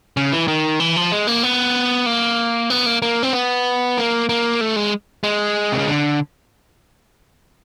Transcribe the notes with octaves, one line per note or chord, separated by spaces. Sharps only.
C#3
E3
D#3
E3
F3
G#3
A#3
B3
A#3
B3
A#3
A#3
C4
B3
A#3
A#3
A3
G#3
G#3
C3
C#3
D3